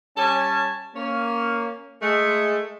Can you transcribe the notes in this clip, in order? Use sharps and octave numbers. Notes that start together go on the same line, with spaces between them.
G3 C#4 C#5 G#5 A5
A#3 C#4
G#3 A3